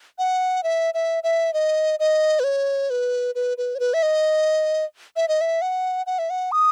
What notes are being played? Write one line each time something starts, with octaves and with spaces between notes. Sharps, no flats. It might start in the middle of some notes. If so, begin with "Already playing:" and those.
F#5
E5
E5
E5
D#5
D#5
B4
C#5
B4
B4
B4
C#5
B4
E5
D#5
E5
D#5
E5
F#5
F#5
E5
F#5
D#6